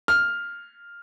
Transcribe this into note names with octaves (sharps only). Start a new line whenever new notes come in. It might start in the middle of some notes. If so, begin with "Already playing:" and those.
F6